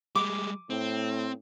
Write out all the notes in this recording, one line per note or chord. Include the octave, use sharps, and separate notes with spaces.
G3 G#3 D6
A2 C4